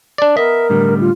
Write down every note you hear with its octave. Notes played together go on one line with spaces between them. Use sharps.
D4 D5
B3 A#4 D#5 E5
A2 D3 G3
F4